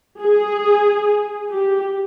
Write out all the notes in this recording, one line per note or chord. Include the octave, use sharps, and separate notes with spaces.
G#4
G4